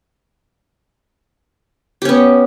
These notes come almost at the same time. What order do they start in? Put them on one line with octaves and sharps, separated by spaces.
G4 C#4 B3